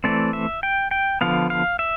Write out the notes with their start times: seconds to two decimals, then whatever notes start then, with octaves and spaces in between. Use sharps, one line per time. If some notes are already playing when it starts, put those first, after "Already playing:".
0.04 E3 A3 C4 D5
0.33 E5
0.63 G5
0.91 G5
1.21 D3 F3 B3 F5
1.50 F5
1.79 E5